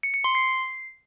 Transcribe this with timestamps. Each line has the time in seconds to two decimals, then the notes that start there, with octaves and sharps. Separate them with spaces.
0.03 C#7
0.14 C#7
0.24 C6
0.35 C7